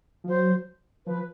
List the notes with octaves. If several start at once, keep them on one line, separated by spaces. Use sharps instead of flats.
F3
F#3 C5
F3 B4